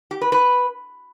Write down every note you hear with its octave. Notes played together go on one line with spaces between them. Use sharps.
G4
B4
B4